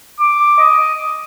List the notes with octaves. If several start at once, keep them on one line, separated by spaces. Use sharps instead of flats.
D6
D#5